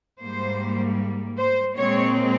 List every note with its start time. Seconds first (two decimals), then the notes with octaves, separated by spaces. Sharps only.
0.20 G#2 G3 A#3 C5
1.37 C5
1.75 A#2 G#3 C4 C#5